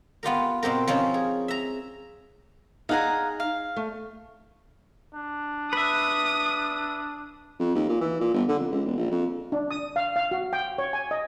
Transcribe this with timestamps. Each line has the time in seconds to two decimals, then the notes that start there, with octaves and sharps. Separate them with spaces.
0.23 B3 F4 G4 A#4
0.63 B2 C4 G4 A#4
0.87 F3 C4 C#4 D#4 F4
1.14 G#4
1.48 E5 A#5
2.89 D#4 G#4 F5 F#5 G#5 A#5
3.40 F5
3.76 A3
5.14 D4
5.73 B4 E5 D#6
7.59 F2
7.75 D#2
7.89 A#2
8.01 E3
8.20 A#2
8.33 G1
8.48 D3
8.59 F2
8.71 C#2
8.86 E1
8.97 A#1
9.11 F2
9.52 D4
9.71 D#6
9.96 F5
10.16 F5
10.31 F#4
10.53 G5
10.78 C#5
10.93 G#5
11.11 D#5